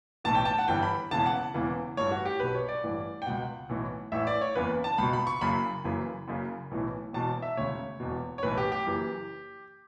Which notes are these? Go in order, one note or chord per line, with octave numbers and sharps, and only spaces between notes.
B1 A2 E3 A5
G5
A5
F#5
G1 G2 E3 G5
B5
E1 E2 C#3 E3 A5
F#5
E1 E2 C#3 E3
A1 G2 E3 C#5
F#4
G4
B1 B2 B4
C#5
D5
A1 G2 E3
G5
C#2 B2 F#5
B1 A2 E3
A1 A2 E3 E5
D5
C#5
F#1 E2 C#3 E3 B4
A5
C#2 B2 B5
B5
C#6
F#1 F#2 C#3 B5
F#1 F#2 C#3 E3
F#1 F#2 C#3
B1 A2 E3
E1 E2 B2 A5
E5
E1 D2 C#3 C#5
E1 E2 B2
C#5
B1 A2 E3 B4
G4
G4
F#1 F#2 E3